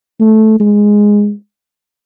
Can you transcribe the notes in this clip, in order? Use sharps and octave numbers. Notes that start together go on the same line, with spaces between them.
A3
G#3